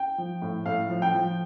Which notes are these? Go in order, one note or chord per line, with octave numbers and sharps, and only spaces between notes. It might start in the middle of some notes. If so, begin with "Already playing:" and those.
Already playing: G5
F3
A2
A2 F5
F3
G5
F3